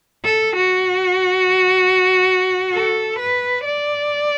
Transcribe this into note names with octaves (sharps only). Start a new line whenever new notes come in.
A4
F#4
A4
B4
D5